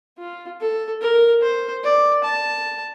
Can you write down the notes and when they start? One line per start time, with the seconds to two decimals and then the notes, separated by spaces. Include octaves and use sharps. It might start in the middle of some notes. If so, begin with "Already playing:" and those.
0.19 F4
0.61 A4
1.01 A#4
1.42 C5
1.84 D5
2.24 A5